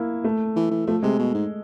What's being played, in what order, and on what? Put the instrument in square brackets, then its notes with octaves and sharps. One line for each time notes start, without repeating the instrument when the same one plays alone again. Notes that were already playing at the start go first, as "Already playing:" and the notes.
Already playing: [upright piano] A#3 E4
A3
[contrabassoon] E3
E3
[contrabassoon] F3 [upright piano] A3
[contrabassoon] C3 [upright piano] G#3
[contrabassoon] B2
G#2